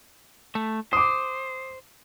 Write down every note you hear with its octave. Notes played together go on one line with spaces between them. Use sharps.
A3
C5 D6 D#6